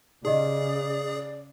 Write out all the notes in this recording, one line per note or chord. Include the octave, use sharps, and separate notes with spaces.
C#3 D#4 G4 G#4 D5 D#5